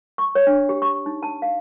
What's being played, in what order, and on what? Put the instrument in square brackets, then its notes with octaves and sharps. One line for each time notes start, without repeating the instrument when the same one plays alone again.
[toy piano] C#6
C#5
D4
G4
C#6
D#4
A5
F5